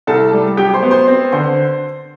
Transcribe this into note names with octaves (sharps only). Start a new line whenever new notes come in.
C2 A4 A5
G3
F#3 G4 G5
C5 C6
B3
C5 C6
C4
D3 C5 C6